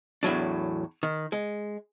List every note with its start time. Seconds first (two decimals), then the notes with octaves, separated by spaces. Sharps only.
0.23 E2 A2 F#3 D4
1.03 D#3
1.32 G#3